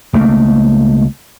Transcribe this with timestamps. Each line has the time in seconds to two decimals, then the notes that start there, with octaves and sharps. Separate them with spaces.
0.13 C#2 A3 A#3